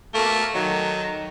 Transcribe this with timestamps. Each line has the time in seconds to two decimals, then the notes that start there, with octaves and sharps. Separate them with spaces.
0.14 B2 A3 A#3
0.55 D#3 F#3